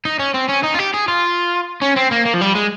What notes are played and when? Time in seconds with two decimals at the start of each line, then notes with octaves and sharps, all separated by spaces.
0.05 D#4
0.20 C#4
0.34 C4
0.49 C#4
0.64 D#4
0.75 F4
0.79 G4
0.94 G#4
1.08 F4
1.82 C#4
1.97 C4
2.12 A#3
2.26 A#3
2.34 F3
2.41 G3
2.56 G#3